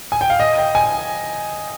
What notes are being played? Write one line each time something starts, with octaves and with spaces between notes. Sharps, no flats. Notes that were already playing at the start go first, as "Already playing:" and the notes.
G#5
G5
F5
D#5
G5
G#5